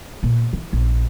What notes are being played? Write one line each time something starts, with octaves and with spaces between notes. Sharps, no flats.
A#2
E3
A#1